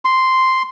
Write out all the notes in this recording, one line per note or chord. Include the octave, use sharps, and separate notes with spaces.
C6